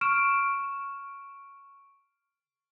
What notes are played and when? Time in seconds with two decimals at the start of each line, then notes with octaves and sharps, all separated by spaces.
0.01 C#6 F6 D7 E7